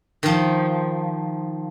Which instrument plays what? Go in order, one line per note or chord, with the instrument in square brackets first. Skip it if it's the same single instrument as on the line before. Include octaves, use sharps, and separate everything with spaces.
[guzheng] D#3 F3